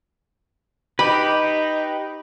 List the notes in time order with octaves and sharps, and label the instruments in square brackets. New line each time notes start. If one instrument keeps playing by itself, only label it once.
[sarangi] D#4 [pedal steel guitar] G4 B4 [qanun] B5